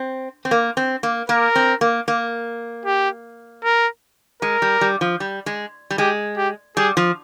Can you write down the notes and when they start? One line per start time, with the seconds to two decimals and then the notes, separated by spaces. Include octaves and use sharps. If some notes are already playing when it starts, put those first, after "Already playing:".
Already playing: C4
0.45 C4
0.51 A#3
0.77 C4
1.03 A#3
1.29 A#3 A#4
1.56 C4
1.81 A#3
2.08 A#3
2.86 G4
3.64 A#4
4.42 G#3 A#4
4.62 G3
4.81 G3
5.01 F3
5.20 G3
5.46 G#3
5.90 G3
5.98 G#3 G4
6.37 G4
6.77 G3 G#4
6.97 F3